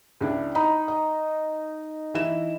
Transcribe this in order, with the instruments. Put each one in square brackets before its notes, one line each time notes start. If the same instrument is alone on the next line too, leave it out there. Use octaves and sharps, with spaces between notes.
[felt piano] C#2 D4 E4
[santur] D#4 [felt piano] B5
[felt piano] D#5
E3 E4 E7